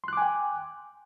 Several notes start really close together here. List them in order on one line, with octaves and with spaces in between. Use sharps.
C6 F#6 D6 G#5 G5